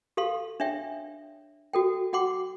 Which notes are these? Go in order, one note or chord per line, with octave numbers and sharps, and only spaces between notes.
G4 A4 F5 C6
D4 C#5 E5 G5
F#4 A4 G5
F#4 F#5 G5 C6 D6